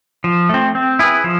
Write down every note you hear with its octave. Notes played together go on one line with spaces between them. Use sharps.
F3
A3 C4
C4
E4 G#4 B4
F3